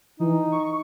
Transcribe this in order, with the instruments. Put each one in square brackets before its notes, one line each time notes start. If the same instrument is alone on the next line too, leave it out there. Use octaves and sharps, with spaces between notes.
[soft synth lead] E3 [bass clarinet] D#4
[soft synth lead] C#6